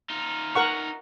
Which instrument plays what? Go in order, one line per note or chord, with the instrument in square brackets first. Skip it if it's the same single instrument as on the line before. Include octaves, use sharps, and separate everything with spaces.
[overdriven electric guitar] D#4 F4
[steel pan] A#4 F#5 C#6